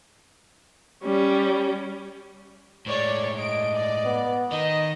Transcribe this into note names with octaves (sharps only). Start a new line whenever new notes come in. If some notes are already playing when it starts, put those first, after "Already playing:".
G3 C#4
A2 G#3 C#5 D5
D#5 D7
D5
B3
D#3 D#4 D#5